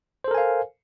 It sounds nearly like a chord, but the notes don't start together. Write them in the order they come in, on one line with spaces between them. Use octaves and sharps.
C5 A4 A#4 G#5 F5